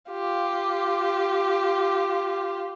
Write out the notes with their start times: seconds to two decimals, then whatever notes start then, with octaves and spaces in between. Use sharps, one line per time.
0.11 F4 G4